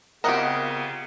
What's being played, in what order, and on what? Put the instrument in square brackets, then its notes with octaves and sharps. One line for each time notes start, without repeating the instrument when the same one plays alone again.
[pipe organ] C#3 B3 [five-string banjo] C4 F4 G4 [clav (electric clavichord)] A#4 D#5 F#5